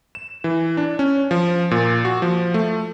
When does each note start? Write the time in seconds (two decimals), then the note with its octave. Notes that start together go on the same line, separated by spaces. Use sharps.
0.15 E7
0.44 E3
0.77 D4
0.99 C#4
1.31 F3
1.71 A#2
2.05 F#4
2.22 F3
2.54 A3